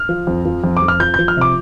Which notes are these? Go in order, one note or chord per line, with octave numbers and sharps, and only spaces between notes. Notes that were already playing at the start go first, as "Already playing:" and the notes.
Already playing: F6
F3
F2
F3
F2
D6
F2
F6
F3 G6
F3 G6
F6
C3 D6